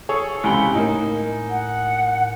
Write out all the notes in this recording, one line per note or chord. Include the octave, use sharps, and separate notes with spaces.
G#4 A4 C#5
C#2 C3 E4 G#5 B5 G7
A2 A#3 D#4
F#5